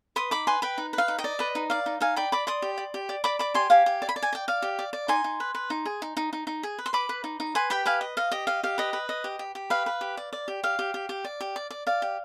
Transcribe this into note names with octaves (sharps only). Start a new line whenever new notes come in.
B4 C6 D#6
D#4 B5 D6
B4 G#5 C6
B4 G5 B5
D#4
B4
F5
D#4
D#5 G5
D5
B4 D#5
D#4
D5 F5
D#4
D#4 F5 G#5
D5 G5 B5
D5 B5 D6
D5 C6 D#6
G4
D5
G4
D5
D5 B5 D6
D5 B5 D6
G4 G#5 C6
G4 F5 G#5
G4
D5
B5
D5
G#5
D5 G5
D5 F5
G4
D5
D5
D#4 G#5 C6
D#4
B4
B4
D#4
G#4
D#4
D#4
D#4
D#4
G#4
B4
C6
B4 B5 D6
B4
D#4
D#4
B4 G#5 C6
G4 G5 B5
B4 F5 G#5
D#5
D#5 F5
G4 D#5
D#5 F5
G4 F5
B4 D#5
B4
D#5
G4
G4
G4
B4 F5
B4
G4
D5
D5
G4
G4 F5
G4
G4
G4
D5
G4
D5
D5
D5 F5
G4